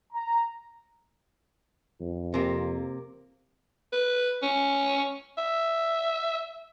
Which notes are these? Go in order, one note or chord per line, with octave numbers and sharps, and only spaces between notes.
A#5
F2
C3 A#3
B4
C#4
E5